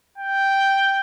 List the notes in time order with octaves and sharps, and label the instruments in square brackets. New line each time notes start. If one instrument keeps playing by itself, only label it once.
[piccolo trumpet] G5